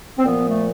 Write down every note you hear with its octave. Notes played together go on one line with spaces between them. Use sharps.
C4
A#2 F3 B3
A3